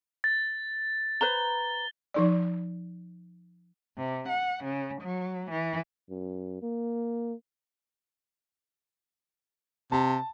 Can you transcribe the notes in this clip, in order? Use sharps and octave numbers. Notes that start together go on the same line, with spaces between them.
A6
B4 C5 A#5 G7
F3 D#4 D5
C3
F#5
C#3
F#3
E3
F#2
A#3
C3 A5